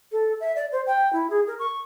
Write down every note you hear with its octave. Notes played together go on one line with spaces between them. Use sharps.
A4
E5
D5
C5
G5
E4
G#4
A#4
C#6